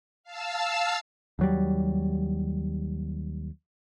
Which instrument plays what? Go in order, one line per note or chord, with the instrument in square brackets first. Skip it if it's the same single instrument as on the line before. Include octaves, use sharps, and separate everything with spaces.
[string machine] F5 A5 E6
[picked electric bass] D#2 F#3 G3